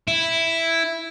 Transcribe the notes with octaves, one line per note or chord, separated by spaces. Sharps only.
E4